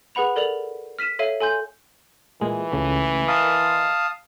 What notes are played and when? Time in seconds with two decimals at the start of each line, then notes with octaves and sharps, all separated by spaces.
0.15 G#4 B4 F#5 B5 F7
0.36 A4 A#4 D5 F7 F#7
0.99 F6 B6 D#7 E7
1.19 A4 C#5 E5 F5 D#7
1.40 A4 G#5 C6 G6
2.41 A#2 E3 G#3
2.72 C#2 C#3 A3
3.28 A#4 D#5 F5 A5 C6 D#6